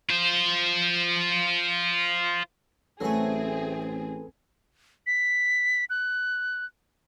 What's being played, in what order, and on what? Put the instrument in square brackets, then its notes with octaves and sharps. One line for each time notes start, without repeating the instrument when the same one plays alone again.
[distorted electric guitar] F4 C5
[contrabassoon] A1 [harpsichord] F#3 A3 [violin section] C4 G#4 [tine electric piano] A4 B4 G#5
[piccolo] B6
F#6